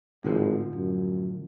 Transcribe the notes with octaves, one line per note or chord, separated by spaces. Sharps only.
G#1 A2 D3 F3
F#2